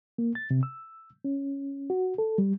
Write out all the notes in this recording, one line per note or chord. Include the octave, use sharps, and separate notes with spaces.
A#3
A6
C3
E6
C#4
F#4
A4
G3